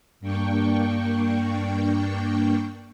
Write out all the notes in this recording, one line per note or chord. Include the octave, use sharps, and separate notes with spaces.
G2 A#3 D4 G5 C#6